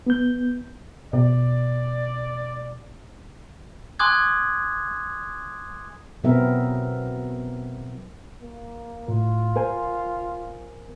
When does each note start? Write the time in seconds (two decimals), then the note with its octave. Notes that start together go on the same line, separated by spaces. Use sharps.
0.07 B3 G6
1.13 B2 D5
3.99 G#5 C6 D6 D#6 F#6 G#6
6.24 B2 F#3 B3 C4 A#4 E5
8.42 A#3
9.08 A2 F4
9.56 A#4 C5 G#5